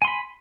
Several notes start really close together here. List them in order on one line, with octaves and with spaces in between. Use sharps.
G#5 C6 B5